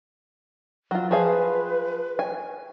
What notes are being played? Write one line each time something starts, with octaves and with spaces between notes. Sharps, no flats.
F#3 F4
F3 G#4 B4 F5
G#5